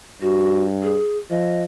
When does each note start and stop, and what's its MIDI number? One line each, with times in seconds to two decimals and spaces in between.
0.22 0.98 43
0.22 0.63 66
0.83 1.17 68
1.30 1.64 53
1.30 1.63 75